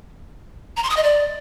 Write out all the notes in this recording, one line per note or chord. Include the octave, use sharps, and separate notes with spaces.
A#5
C6
D#6
D#5
D5